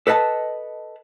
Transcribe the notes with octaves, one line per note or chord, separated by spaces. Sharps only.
A4 B4 D#5 F5 A5